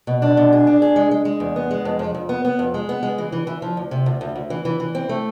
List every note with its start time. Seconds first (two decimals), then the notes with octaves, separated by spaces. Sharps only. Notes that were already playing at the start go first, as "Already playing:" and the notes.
0.07 B2
0.22 D4
0.37 B2
0.53 G#4
0.67 D4
0.82 G#4
0.96 G#3
1.11 G#3
1.25 G#3
1.40 E2
1.56 B3
1.71 G#3
1.85 F2
1.99 F2
2.15 F2
2.29 B3
2.45 B3
2.59 F2
2.74 G#3
2.89 B3
3.03 G#3
3.18 E3
3.32 E3
3.47 E3
3.62 F3
3.77 D2
3.91 C3
4.06 D2
4.21 D2
4.35 D2
4.50 E3
4.65 E3
4.80 E3
4.95 C4
5.09 A3